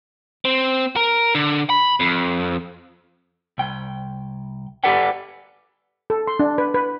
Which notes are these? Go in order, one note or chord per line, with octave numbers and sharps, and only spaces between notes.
C4
A#4
D3
B5
F2
C2 G5
G4 A4 B4 D5 F#5 G5
A4
C6
D4
B4
B4